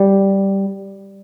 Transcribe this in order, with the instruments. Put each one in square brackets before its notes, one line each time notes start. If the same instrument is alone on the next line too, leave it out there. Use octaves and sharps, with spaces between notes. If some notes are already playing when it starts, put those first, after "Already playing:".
Already playing: [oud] G3